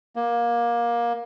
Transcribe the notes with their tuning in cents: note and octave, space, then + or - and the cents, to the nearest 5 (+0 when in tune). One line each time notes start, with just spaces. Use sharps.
A#3 +20